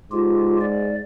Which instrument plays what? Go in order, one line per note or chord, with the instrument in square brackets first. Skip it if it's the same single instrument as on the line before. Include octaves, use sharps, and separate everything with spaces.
[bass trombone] G#2 [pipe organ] F4 G4
[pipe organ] D5